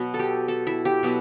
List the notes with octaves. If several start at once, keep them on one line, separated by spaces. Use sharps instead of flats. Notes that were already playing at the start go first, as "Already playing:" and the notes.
Already playing: B2 F#3 B3
A4
G4
A4
E4
G4
B2 F#3 B3